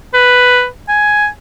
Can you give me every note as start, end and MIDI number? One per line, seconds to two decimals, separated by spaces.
0.14 0.66 71
0.88 1.28 80